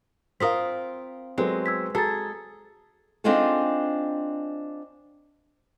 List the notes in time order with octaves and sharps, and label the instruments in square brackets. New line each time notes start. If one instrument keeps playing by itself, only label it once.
[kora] C4 F4 A#4 [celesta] F5 D#6 B6
[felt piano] F#3 B3 C4 [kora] G#3 [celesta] G4 A4
[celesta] E6 G#6 B6
[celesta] F#4 A#5 A6 [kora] G#4 [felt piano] A4
[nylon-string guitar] C4 D4 D#4 F4 G#4 A4